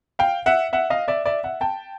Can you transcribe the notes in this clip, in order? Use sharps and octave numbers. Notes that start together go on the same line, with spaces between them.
F5 G5
E5 F#5
E5 F#5
D#5 F5
D5 E5
D5 E5
E5 F#5
G5 A5